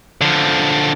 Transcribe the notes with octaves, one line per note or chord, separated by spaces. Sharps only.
D3 F3